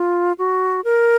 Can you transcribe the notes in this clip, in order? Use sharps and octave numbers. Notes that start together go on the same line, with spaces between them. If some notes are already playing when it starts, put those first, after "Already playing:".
Already playing: F4
F#4
A#4